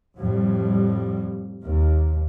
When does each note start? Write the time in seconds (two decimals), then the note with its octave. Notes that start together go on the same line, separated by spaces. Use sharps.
0.17 F2 A2 G3
1.66 D#2